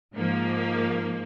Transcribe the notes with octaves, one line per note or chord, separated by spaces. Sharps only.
G#2 F3 A#3